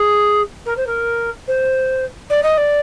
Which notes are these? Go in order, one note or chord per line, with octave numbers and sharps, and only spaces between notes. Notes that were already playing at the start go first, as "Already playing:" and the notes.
Already playing: G#4
A#4
C5
A#4
C5
D5
D#5
D5